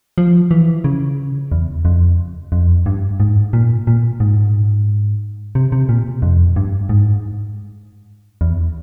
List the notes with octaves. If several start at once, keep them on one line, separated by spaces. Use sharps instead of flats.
F3
E3
C#3
E2
F2
F2
G2
G#2
A#2
A#2
G#2
C3
C3
A#2
F2
G2
G#2
E2